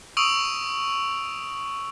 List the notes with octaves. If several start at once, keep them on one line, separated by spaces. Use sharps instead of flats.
C#6 D#6 E6 D7 F7